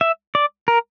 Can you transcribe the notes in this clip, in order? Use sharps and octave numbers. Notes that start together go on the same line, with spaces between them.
E5
D5
A#4